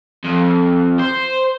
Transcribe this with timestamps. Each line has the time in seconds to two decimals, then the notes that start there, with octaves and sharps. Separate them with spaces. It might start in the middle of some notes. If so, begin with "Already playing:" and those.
0.24 F2
0.99 C5